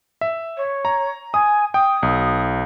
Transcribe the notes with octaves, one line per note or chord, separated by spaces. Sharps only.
E5
C#5
A#5
G#5 D#6
G5 D#6
B1